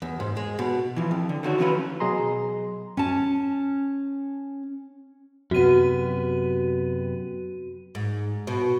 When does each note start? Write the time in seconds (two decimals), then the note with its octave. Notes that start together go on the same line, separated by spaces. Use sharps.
0.02 E2
0.20 G#2
0.37 G#3
0.59 B2
0.96 E3 F3
1.11 F2
1.29 D3
1.43 D3 D#3 F#4 C#5
1.58 E3 F#3 C#4 E4 F4 B4
2.00 B2 F#3 G#4 D#5 A#5 C6
2.97 C#4 A5
5.51 F#2 C3 B3 F#4 D#7
7.95 G#2
8.47 B2